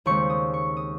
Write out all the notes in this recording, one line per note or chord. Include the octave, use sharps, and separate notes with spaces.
D#2 C#3 G#3 C4 C#6
D#6
C#6
D#6